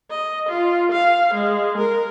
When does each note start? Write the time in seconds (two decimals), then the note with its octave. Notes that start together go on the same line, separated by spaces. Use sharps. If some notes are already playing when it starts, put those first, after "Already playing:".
0.11 D#5
0.49 F4
0.92 F5
1.34 G#3
1.78 A#4